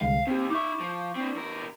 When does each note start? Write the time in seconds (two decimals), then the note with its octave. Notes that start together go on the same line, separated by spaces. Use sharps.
0.01 C2 D3 G#3 F5
0.27 D#2 C4 G4
0.50 D#4 E5 C#6 D6
0.80 F3
1.15 C4 D4
1.35 E2 A#4